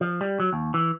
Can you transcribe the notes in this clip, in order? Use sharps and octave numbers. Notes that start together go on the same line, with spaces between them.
F3
G3
F#3
D#2
E3